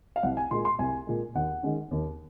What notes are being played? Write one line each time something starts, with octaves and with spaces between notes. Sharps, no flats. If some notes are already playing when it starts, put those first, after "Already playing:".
F5
C2 F#5
G#5
A#2 G#3 C6
C6
C2 G#5
A#2 G#3
D#2 F#5
D#3 G#3 C#4
D#2